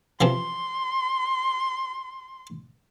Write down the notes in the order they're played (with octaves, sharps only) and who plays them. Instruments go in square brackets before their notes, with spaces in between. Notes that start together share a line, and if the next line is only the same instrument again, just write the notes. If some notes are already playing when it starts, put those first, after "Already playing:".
[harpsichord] C3 E3 F3 [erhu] C6